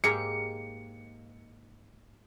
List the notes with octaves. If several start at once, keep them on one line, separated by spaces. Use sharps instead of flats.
G#2 A#3 G4 G#4 A#4 C#7